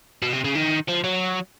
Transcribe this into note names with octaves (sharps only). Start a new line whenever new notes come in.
B2
C3
C#3
D#3
F3
F#3